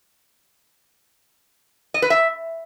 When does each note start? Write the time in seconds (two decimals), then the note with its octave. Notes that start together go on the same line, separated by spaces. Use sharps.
1.94 D#5
2.02 B4
2.10 E5